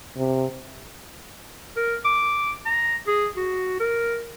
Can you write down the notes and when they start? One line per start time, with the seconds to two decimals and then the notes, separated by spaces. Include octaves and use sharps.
0.17 C3
1.76 A#4
2.05 D6
2.66 A#5
3.07 G#4
3.37 F#4
3.80 A#4